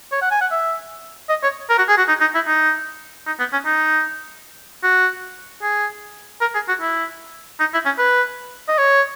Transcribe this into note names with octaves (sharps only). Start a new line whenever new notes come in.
C#5
F#5
G#5
F#5
E5
D#5
C#5
A#4
F#4
G#4
F#4
D#4
D#4
E4
D#4
D#4
B3
C#4
D#4
F#4
G#4
A#4
G#4
F#4
E4
D#4
E4
C#4
B4
D#5
C#5